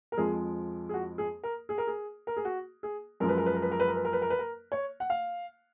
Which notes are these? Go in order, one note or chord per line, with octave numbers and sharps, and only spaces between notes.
A#4
F2 F3 G#3 G#4
G#4
F#4
G#4
A#4
G#4
A#4
G#4
A#4
G#4
F#4
G#4
F#2 F3 G#3 A#4
B4
A#4
B4
A#4
B4
A#4
B4
A#4
B4
A#4
B4
A#4
B4
A#4
C#5
F#5
F5